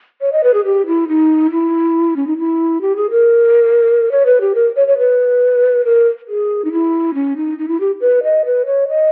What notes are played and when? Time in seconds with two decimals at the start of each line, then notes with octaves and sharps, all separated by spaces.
0.21 C#5
0.32 D#5
0.43 B4
0.54 G#4
0.65 G4
0.86 E4
1.08 D#4
1.51 E4
2.16 C#4
2.27 D#4
2.38 E4
2.81 G4
2.96 G#4
3.10 A#4
4.12 C#5
4.26 B4
4.41 G4
4.55 A#4
4.76 C#5
4.88 C#5
4.98 B4
5.85 A#4
6.28 G#4
6.65 D#4
6.72 E4
7.14 C#4
7.37 D#4
7.59 D#4
7.68 E4
7.80 G4
8.01 B4
8.23 D#5
8.45 B4
8.66 C#5
8.89 D#5